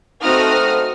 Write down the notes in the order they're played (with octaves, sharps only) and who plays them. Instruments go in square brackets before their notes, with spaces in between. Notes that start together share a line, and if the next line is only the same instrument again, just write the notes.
[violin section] A3 C4 D#4 F#4 D#6 F6